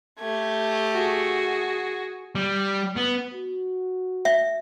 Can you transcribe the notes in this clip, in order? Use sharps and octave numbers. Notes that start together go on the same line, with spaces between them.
A3 G4 G#6
F#4 G#4
G3
B3
F#4
E5